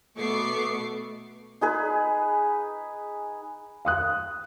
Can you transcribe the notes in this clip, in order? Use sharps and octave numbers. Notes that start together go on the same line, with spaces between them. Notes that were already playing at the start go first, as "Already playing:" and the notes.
B2 A3 B3 C#6 D6 C7
D#4 G#4 B4
F5 D#6 F#6